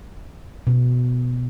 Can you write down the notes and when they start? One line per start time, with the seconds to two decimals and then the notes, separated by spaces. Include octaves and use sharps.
0.67 B2